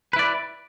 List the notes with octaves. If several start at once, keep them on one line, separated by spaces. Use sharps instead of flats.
E4 B4 D5